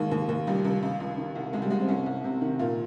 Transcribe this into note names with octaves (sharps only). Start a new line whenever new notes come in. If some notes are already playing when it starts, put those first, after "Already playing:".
Already playing: D#2 D#3 G#3
D#2
D#2
C#2 G3
C#2
C#2
C#2
D#3
C2
C2 G#3
G3
C2 G#3
C4
C2 C#4
C2
C3
D#3
A#2 F4